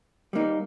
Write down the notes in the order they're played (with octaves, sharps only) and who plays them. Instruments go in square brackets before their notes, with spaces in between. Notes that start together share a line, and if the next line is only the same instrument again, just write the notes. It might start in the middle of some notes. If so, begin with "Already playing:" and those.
[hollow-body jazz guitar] G3 A#3 D#4